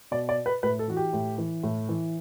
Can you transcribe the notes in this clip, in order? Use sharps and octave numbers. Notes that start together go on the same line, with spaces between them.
B2 D5
D5
B4
A2 B4
A4
E3 F#4
G4
A2
E3
A2
E3